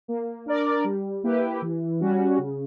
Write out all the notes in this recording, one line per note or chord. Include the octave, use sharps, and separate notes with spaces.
A#3
D4 A#4 D5
G3
A#3 E4 G4 B4
E3
G3 C#4 F#4
C#3